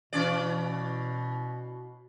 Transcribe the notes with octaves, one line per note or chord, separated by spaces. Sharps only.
B2 E3 C#4 D5